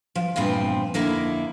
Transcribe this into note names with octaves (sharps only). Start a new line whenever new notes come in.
F3
E2 G2 A#2 F3 C4 G5
F2 D3 A#3 D#4 E4 A#4